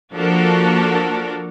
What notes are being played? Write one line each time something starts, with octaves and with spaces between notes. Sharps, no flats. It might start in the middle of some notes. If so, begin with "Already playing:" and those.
F3 A#3 D4 F#4 A4 A#4